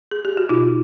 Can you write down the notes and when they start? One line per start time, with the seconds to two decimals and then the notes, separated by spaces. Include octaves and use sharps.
0.11 G#4
0.25 G4
0.37 F#4
0.49 B2 D#4 F4